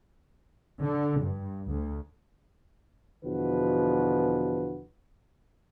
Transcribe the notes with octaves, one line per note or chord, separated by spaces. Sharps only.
D3
G2
D2
E2 B2 D3 F3 F#4 B4